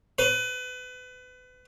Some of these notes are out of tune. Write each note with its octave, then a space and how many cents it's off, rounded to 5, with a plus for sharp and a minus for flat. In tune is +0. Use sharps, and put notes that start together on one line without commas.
B4 +30